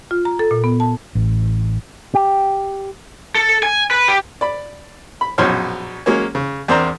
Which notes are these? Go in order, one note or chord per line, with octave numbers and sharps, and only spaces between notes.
F4
A#5
A4
A#2
B3
A5
A1
G4
A4
G#5
B4
G4
D5 B5
B5
A#1 F#2 B2 C5 C#5 F6
F#3 G#3 A#3 C#4
C#3
E2 C4 D4 A#4 C5 A#5